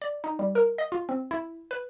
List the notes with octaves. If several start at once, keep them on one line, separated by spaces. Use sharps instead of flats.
D5
D#4
G3
A#4
D#5
F4
C4
E4
B4